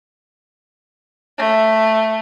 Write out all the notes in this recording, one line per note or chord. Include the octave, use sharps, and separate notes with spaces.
A3